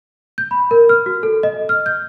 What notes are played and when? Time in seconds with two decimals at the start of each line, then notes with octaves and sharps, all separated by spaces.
0.38 G6
0.51 B5
0.71 A#4
0.89 F6
1.06 F#4
1.23 A4
1.43 D#5
1.69 F6
1.86 G6